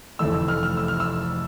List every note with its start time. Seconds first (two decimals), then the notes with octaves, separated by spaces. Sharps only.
0.19 F1 F2 E3 A3 E6
0.34 E6
0.48 F6
0.63 F6
0.77 E6
0.88 F6
1.00 E6